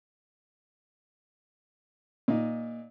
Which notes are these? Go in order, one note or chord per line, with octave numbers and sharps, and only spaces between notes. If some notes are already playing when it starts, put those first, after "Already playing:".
A#2 D#4